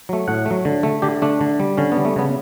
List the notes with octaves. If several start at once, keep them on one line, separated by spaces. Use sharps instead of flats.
F#3 A3
A2 F#5
A3
F#3
D3
A3
D3 G4
A3 D4
D3
G3
D3 C#4
G3 B3
A3
C#3 B3